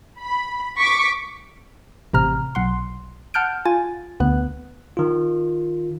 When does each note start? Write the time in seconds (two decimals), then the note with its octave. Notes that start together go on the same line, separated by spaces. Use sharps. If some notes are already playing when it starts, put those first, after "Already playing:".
0.20 B5
0.78 C#6 D6 B6 D7
2.13 A1 C3 A#5 F6
2.55 B1 F#5 C6
3.34 F#5 A5 F6 G6 D7
3.65 F4 G#5 A6
4.20 D2 B3 F#6
4.97 D#3 F4